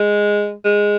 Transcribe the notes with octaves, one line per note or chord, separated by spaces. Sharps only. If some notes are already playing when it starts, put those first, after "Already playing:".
Already playing: G#3
G#3